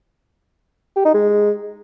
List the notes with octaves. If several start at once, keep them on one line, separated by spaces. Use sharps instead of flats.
G4
D#4
G#3